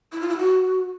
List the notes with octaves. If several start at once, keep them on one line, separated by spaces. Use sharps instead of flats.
E4
F4
E4
F#4